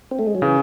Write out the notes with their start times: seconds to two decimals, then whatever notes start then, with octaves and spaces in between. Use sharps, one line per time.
0.11 C4
0.19 A3
0.27 G#3
0.35 F#3
0.42 C#3 E3